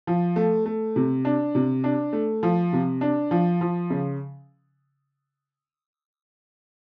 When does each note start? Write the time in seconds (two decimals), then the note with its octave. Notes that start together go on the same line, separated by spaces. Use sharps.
0.07 F3
0.36 A3
0.66 A3
0.96 C3
1.25 D4
1.55 C3
1.84 D4
2.13 A3
2.43 F3
2.73 C3
3.01 D4
3.31 F3
3.61 F3
3.90 C#3